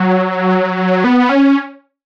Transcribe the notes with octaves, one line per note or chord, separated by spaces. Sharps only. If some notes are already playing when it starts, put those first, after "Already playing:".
Already playing: F#3
B3
C#4